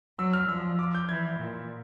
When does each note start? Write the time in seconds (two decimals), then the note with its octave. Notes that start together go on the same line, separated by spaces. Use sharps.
0.18 F#3 E6
0.33 F6
0.48 F3 E6
0.79 D6
0.95 G6
1.09 E3 G#6
1.40 A#2